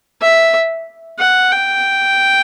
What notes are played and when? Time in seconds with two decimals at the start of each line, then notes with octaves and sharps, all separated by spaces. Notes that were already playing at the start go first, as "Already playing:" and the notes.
0.22 E5
1.19 F#5
1.52 G5